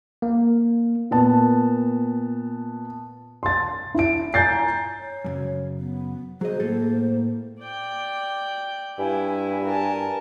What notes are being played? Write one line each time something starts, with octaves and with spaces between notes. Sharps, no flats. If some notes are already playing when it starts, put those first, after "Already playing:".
A#3
A#2 B3 A5
C6 A6
E4 D7
G#5 A#5 G6 A6 C7
C#5
F#2 A#2 C#3
B3
F#3 G#4 C5 D#5
A2 A#3 A4
D5 G5
G2 E4 G#5
A#4 A5